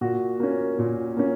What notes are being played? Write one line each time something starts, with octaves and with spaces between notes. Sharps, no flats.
A#2 F#4
A#3 C#4
A#2
A#3 C#4